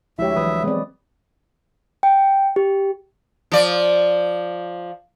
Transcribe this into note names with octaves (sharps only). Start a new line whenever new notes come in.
D2 F3 G#3 E4 G4 C#5 E5
E3 F#3 B4 B5 D#6
G#3 B3 C4 D5
G5
G4
F3 D5